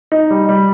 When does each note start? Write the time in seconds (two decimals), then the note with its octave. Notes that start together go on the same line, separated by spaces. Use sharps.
0.12 D#4
0.30 G3
0.49 G3